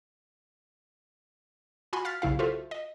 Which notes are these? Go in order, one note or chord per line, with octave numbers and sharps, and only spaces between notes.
F4 F#4 G#5 B5 C6
F5 F6 A6 B6
B1 C#3 E4 F5
F4 F#4 A4 C5 E5
D#5